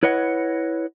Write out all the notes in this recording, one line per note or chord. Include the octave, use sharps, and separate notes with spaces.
E4 B4 C#5 D#5 F#5